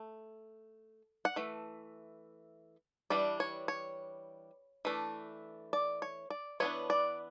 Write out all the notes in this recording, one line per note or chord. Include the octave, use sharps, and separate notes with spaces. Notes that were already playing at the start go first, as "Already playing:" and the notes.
Already playing: A3
F#5
E3 A3
E3 G3 D4 D5
C#5
C#5
E3 A3 D4
D5
C#5
D5
E3 B3 D4 C#5
D5